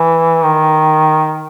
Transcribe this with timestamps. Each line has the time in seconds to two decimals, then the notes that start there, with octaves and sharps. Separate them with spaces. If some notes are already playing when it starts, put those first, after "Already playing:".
Already playing: E3
0.43 D#3